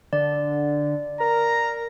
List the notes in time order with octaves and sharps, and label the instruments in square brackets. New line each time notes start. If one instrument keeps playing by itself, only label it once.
[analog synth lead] D3 [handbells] D5
[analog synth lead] A#4 [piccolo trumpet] A#5